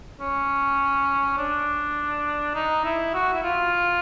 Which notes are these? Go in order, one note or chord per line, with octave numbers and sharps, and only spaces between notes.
C#4
D4
D#4
E4
F#4
E4
F4